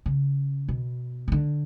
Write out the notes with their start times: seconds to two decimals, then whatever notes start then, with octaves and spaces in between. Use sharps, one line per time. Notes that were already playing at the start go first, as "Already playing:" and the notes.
0.06 C#3
0.68 B2
1.28 C#3
1.32 D3